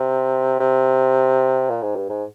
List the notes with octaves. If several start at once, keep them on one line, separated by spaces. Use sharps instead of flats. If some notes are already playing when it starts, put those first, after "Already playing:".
Already playing: C3
C3
A#2
G#2
G2
G#2